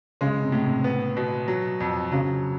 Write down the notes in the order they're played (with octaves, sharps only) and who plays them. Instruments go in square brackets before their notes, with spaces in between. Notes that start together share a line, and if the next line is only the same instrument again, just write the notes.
[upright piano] C#3 [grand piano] G#3
[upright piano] C3
[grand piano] A2
[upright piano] C3
[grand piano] B3
B2
F#3
F2
[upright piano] C#3 [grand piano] F#3